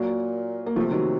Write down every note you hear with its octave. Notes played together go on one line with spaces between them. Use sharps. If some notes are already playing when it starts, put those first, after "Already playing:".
Already playing: A#2 F#3 A#3
A#3
C3 F3 A3
D#3 F#3